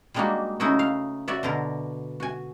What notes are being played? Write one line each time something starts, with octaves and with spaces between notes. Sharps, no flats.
G3 G#3 A#3 D4 D#4 F#4
C#3 A3 D#4 E4 F#4
F5
F#4 C#5 D5 E5 F#5
B2 D3 A#4
F#4 G#5